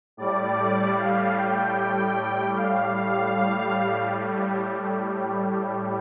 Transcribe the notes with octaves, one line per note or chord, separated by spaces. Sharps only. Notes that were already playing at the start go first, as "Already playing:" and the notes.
A2 G3 D5
F5
G5
F5
A2 G3